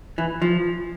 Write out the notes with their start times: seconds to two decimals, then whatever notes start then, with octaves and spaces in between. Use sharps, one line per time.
0.18 E3
0.42 F3